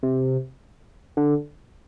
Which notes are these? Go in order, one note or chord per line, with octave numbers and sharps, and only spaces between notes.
C3
D3